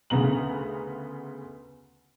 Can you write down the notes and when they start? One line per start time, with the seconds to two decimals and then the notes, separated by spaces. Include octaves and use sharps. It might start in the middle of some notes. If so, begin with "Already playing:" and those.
0.10 D2 C#3 B3 A#5 F#7